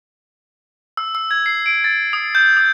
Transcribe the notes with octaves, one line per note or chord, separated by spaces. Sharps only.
E6
E6
G#6
C7
D7
A6
D#6
G6
D#6